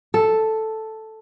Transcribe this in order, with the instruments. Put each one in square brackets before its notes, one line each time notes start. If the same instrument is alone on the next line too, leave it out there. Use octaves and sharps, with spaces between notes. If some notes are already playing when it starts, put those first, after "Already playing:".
[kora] A4